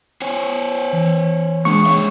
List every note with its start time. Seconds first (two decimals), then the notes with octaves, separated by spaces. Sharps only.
0.22 C5 C#5 G#5
0.93 E3
1.65 G#3 A#3 D4 C#6
1.86 G#4 C#5 E5